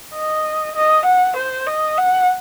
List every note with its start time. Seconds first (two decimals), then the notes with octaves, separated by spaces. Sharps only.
0.15 D#5
0.76 D#5
1.06 F#5
1.37 C5
1.67 D#5
1.98 F#5